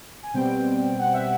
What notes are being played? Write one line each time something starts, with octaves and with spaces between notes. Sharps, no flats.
G#5
B2 G3 C4 G5
G5
F#5
E5